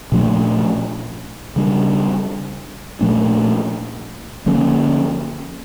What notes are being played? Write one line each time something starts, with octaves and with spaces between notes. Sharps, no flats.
A#2 F3 A3 D4
C#3 G3 D4
A#2 F3 A3 D4
D3 F3 A#3 C#4